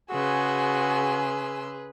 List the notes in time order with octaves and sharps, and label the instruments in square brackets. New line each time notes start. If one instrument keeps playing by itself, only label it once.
[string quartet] C#3 C6 E6 [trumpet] F#4 [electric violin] G#4 B4 [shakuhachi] G#5